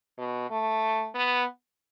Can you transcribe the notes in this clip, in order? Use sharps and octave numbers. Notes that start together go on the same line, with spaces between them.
B2
A3
B3